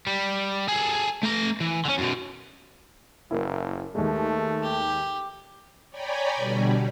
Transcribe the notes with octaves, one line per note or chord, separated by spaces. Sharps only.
G3
G#4 A4
A3 A#5
E3
D3 C#4
F#2 B2
F#1 A#3 E4
D#2 G#3 A3
G4
C#5 D5 G5 G#5 A#5 B5
B2 D3 G3